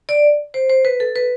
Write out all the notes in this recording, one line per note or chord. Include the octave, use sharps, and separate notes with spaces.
D5
C5
C5
B4
A4
B4